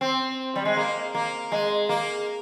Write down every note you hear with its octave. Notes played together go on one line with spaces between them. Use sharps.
C4
G3
G#3
A#3
A#3
G#3
A#3